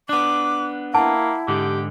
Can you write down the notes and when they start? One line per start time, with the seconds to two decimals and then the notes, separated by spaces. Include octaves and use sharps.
0.09 B3 D4 D6
0.94 A#3 E4 F#5 A5
1.48 G#2 D3 G4